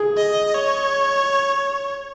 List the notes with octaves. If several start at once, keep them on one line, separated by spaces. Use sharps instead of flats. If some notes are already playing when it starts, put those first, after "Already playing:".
Already playing: G#4
D#5
C#5